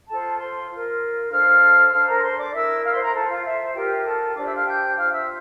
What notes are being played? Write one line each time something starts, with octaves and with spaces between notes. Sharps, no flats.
F4 A4 C5 A5
C5 C6
F4 A#4
D4 A4 C5 F5 F6
E6
D4 A4 C5 F5 F6
A#4 A#5
C5 C6
D5 D6
E4 A#4 E5 E6
F5 F6
C5 C6
A#4 A#5
F4 A4 C5 A5
F4 F5
E5
F4 G4 A#4 G5
A4 A5
D4 G4 C5 D5 D6
E5 E6
F5 F6
G5 G6
F4 C5 F5 F6
E5 E6